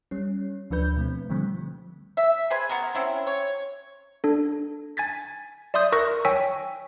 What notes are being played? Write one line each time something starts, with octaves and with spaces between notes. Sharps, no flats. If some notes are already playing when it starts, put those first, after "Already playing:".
G3 C#4
D2 F3 D4 B4 G6
B2 A3 C4
D3 F3 G3 A3 C4
E5
G#4 B4 C5 G#5
B3 F#4 G#4 A#4
C4 C#4 E4
C#5
D4 A4
G#5 G#6 A6 B6
D5 E5 C6 D#6 G6
A#4 C#6 E6 F#6 A#6
C#5 G5 G#5 C#6 E6 B6